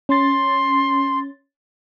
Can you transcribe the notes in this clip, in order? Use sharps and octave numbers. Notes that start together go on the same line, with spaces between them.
C#4 C6 A6